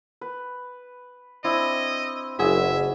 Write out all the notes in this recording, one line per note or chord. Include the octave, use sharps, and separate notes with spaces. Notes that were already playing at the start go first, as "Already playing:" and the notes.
B4
C4 D4 E4 D#5
F#1 F#4 G#4 E5 G#5